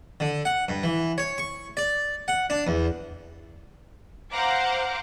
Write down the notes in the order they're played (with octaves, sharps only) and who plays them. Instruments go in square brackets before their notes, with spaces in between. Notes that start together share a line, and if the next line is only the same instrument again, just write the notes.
[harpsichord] D3
F#5
G2
E3
C#5
C#6
D5
F#5
D4
E2
[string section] C5 F5 F#5 A#5 D6